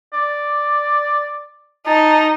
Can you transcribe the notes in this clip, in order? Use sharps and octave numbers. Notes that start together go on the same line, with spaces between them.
D5
D#4 A5